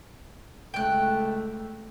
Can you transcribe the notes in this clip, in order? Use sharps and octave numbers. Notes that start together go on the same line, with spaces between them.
C#2 A3 G5 F#6